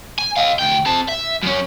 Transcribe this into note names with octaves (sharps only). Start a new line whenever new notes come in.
G#5
D#5 F5
D2 G5
C4 A5
E5
F#2 C#4